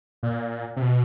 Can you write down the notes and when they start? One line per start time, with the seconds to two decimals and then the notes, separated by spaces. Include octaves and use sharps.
0.23 A#2
0.76 C3
0.82 B2